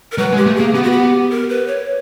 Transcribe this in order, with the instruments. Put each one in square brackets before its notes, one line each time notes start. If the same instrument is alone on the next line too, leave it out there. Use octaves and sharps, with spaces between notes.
[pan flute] A#4
[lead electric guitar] F#3 [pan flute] B4
[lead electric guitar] G#3
[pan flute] G4
[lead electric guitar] A3
[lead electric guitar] A#3 [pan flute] G#4
[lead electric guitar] B3 [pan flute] G4
[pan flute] F#4
G4
A#4
B4
C#5